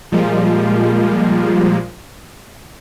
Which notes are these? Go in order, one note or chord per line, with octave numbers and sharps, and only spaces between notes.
A#2 F3 G3 G#3 A#3 F4